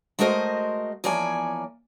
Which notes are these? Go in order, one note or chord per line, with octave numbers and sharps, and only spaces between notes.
G#3 A3 F#4 A#4 C5 D#5
E2 F3 A#3 C#5 D5 G#5